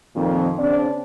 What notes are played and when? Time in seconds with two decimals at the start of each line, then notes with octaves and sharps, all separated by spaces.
0.15 F2 A#2 D#3
0.59 C#3 C4 D4 D5